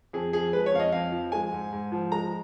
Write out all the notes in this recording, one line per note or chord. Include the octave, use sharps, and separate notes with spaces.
F2 G#4
F3 G#4
G#3 B4
C#5
F2 F5
D#5
F2 F5
F3
G#3 G#5
G#2
G#2
F3
G#3 A#5